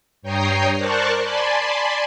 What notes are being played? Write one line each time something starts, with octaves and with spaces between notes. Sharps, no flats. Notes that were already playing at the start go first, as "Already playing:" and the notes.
G2 C#5 G5 A#5 D#6 C7
A#4 C5 D5 A5 C#6 F#6
D5 G#5 A5 B5 C6